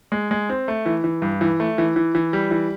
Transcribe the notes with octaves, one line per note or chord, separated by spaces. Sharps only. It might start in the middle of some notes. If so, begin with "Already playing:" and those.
G#3
G#3
C4
A3
E3
E3
G2
E3
A3
E3
E3
E3
G3
E3